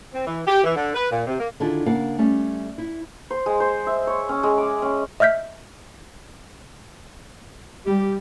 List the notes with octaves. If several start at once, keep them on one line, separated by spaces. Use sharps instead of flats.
C4
E3
G4
E3
D3
B4
A#2
C3
A#3
D3 D#3 D4 E4 F4 G#4
C#3 A#3 D4 A#4 F5 F#5
G3 A3 C#4
E4
C5
G#3
C5
E5
C#5
C#4
G#3
D6
C#4
D#5 E5 F6 G6 B6
G3 G4